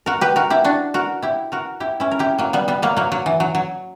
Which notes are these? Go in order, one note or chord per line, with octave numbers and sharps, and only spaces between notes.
F#4 A#4
G4 B4
F#4 A#4
E4 G4
D4 F#4
F#4 A#4
E4 G4
F#4 A#4
E4 G4
C#4 E4
A#4
E4 G4
F#3 A#3
G3 B3
G3 B3
F#3 A#3
F#3 A#3
F#3
E3
F#3
F#3